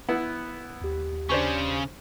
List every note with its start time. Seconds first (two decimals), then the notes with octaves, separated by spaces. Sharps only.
0.09 B3 E4 F#5
0.82 D#2 G4
1.29 C#3 C#4 D4 C5 C#6